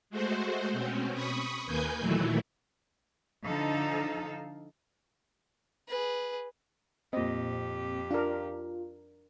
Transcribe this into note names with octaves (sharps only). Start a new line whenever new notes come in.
G#3 A3 F#4 C5
B2 C4 C#4
B5 C#6 D#6
D#2 A#3 B4 G#5 G6
A#2 D#3 E3 F#3 A3 E4
D3 F3 D#4 A4 F5
G#4 B4
F2 A#2 C4 G4 D#5
D4 F4 A#4